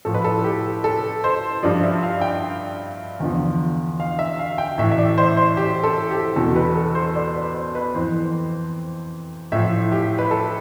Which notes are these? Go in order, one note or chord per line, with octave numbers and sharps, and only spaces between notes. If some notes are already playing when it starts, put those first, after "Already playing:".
A2 F3 A4
B4
A4
G4
A4
C5
G2 F3 D5
E5
F5
G5
E2 D3 F3
F5
E5
F5
G5
A2 E3 E5
E5
D5
C5
C5
G4
A4
G4
E2 B2 A4
B4
A4
C5
D5
B4
C5
B4
F2 E3 C5
A2 F3 E5
G4
B4
A4